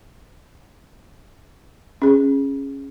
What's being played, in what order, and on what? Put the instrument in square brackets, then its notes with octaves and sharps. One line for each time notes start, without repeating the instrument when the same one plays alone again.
[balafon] C#4 G#4